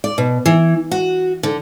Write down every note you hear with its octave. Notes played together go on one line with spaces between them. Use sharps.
D5
B2
E3
F#4
D3